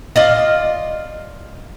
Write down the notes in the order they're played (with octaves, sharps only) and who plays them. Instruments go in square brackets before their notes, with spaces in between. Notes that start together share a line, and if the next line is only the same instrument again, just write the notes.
[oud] F4 D5 D#5